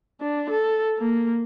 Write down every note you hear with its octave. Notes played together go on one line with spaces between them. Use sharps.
D4
A4
A#3